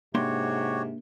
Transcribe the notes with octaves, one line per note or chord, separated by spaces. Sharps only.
G#2 C3 A#3 D4 F#4 G4 C#5 C6